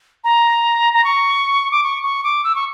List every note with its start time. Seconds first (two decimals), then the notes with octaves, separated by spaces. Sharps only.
0.24 A#5
0.93 A#5
1.04 C#6
1.72 D6
1.84 C#6
2.03 C#6
2.24 D6
2.44 E6
2.55 C#6